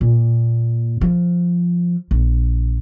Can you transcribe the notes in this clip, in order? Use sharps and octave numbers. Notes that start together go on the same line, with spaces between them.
A#2
F3
A#1